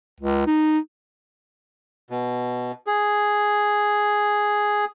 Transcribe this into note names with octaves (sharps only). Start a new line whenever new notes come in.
C#2
D#4
B2
G#4